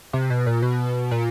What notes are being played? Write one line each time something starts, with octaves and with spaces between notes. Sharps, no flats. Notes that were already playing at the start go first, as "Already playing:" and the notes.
C3
B2
A#2
B2
A#2